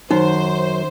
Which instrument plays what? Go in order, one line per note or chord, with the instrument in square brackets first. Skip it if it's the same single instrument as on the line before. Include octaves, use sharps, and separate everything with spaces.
[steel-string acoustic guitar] F#2 [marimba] D#3 [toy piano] D#4 [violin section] C5